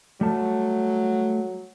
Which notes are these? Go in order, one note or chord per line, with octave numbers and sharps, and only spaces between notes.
F#3 G3 A3 A5